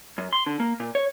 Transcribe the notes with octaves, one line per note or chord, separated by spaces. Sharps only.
F#2
C6
D3
A#3
A#2
C#5